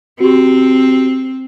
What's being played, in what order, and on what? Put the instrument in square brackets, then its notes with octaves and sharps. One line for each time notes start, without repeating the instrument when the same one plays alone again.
[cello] C4 [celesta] F#4 G4